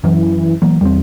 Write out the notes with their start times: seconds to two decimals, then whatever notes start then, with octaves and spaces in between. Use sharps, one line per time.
0.04 F#2 E3
0.62 E3 F#3 A#3
0.81 E2 G3 C4